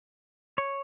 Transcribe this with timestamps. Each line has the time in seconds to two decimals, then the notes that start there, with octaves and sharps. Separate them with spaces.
0.58 C#5